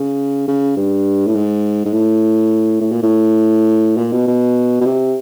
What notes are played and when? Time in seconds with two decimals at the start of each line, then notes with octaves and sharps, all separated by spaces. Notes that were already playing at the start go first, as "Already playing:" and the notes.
Already playing: C#3
0.48 C#3
0.77 G2
1.27 A2
1.35 G#2
1.85 G#2
1.93 A2
2.81 A2
2.92 A#2
3.03 A2
3.97 A#2
4.12 B2
4.27 B2
4.81 B2
4.85 C3